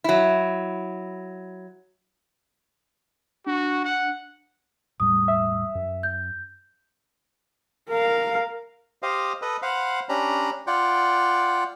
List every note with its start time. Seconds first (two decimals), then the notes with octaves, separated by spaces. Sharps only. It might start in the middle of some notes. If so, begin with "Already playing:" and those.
0.04 F#3 E4
3.46 D4 F#4
3.85 F#5
5.00 E1 A2 G3 D#6
5.28 E5
5.75 F#2
6.03 G6
7.90 A#4 F5
9.02 G4 C5 D#5 F5
9.42 A4 B4 D#5
9.62 C5 F5 F#5 B5
10.09 C#4 D4 G4 A#5 B5
10.67 F4 D5 F#5 G5